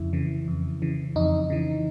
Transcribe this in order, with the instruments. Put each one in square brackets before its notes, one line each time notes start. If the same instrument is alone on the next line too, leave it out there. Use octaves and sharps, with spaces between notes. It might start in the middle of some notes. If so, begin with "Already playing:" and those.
Already playing: [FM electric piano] F2 C#3 E4
C#3 E3
F2
C#3 E3
F2 D#4
C#3 E3